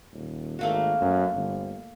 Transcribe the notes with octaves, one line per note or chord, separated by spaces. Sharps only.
D#1
G#1 A3 A#3 F#4
F#2
G1